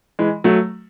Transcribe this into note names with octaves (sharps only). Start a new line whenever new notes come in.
E3 G#3
F#3 A3